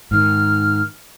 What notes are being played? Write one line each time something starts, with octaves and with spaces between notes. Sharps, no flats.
G#2 D#3 F6